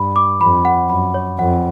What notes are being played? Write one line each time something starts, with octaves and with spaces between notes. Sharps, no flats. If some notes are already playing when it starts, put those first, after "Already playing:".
Already playing: G2 B5
D6
F2 B5
F#5
F#2 B5
C#5
F2 F#5